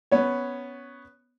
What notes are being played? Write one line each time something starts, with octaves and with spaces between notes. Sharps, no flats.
B3 C#4 C#5